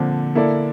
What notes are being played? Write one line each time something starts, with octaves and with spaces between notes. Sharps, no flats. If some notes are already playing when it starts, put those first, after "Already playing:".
Already playing: A#2 D3 F3 C4
A#3 E4 A4 D5